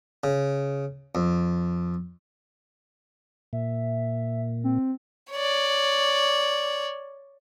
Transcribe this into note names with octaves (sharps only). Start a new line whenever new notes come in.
C#3
F2
A#2 E5
C4
C#5 D5